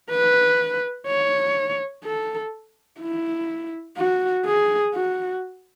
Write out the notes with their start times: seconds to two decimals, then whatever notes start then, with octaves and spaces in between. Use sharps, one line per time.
0.10 B4
1.07 C#5
2.04 A4
3.00 E4
3.97 F#4
4.46 G#4
4.94 F#4